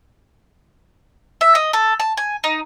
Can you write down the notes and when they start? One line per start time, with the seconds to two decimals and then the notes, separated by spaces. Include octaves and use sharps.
1.41 E5
1.55 D#5
1.73 A4
2.00 A5
2.17 G#5
2.44 D#4